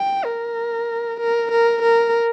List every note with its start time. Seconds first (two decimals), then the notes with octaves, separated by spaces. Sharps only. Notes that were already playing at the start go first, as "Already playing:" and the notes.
Already playing: G5
0.25 A#4
1.20 A#4
1.51 A#4
1.82 A#4